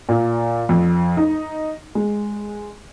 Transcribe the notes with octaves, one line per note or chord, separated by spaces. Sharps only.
A#2
F2
D#4
G#3